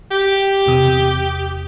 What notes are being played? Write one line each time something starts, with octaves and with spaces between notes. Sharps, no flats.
G4
E2 C3 D#6